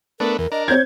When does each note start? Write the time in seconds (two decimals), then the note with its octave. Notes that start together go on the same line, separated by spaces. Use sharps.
0.20 A3 B3 D4 A#4
0.38 E2 A#4
0.52 D4 A#4 D#5
0.68 C4 C#5 G6 G#6